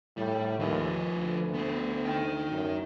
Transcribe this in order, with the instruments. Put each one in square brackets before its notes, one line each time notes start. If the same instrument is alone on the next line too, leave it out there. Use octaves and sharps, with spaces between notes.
[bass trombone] A2 [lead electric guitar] G3
[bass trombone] D#2 [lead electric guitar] F3 B4
[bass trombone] D2
[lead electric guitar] B3 C5
D#4 G5
[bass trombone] F#2